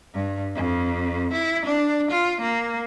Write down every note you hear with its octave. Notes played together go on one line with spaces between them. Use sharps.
G2
F2
E4
D4
F4
A#3